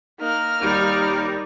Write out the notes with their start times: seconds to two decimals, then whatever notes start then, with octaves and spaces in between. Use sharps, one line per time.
0.20 A#3 D#4 F6
0.61 D#2 G3 D#4 A#4